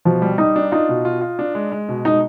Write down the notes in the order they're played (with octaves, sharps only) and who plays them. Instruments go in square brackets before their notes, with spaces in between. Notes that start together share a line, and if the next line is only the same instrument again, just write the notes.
[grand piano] B2 [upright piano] F3
[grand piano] G3
[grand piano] G3 [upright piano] D#4
[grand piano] D4
[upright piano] D#4 [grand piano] F4
[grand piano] B2
F4
F4
D4
G#3
G#3
B2
[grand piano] G#3 [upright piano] D#4